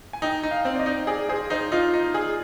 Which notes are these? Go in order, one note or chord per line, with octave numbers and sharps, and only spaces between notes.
G#5
D#4 G5
D#4
F5
C4
D5
D#5
D#4
G#4 D5
G#4 C5
D#4 C5
D#4 F4
D#4
G#4